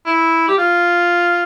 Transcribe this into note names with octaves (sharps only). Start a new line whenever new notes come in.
E4
G4
F4